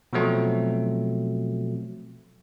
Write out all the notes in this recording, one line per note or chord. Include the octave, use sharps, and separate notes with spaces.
B2 F3 F#3 A3 C4